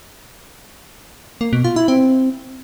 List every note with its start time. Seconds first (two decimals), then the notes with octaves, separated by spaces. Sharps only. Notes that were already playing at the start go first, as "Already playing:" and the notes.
1.41 A#3
1.53 B2
1.64 F4
1.76 E4
1.88 C4